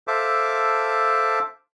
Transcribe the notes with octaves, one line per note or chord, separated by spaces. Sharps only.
A4 C5 E5 F5 A5 D6